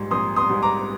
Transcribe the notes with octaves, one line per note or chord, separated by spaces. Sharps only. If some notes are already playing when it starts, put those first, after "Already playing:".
Already playing: A#1 G#2 G3 C6
A#1 C6 D#6
C6 D#6
G#2 G3
A#5 D6